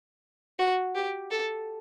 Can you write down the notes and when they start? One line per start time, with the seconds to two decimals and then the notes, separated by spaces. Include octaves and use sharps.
0.59 F#4
0.95 G4
1.31 A4